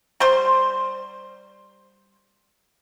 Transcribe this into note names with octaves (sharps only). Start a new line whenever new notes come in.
G3 C5 C6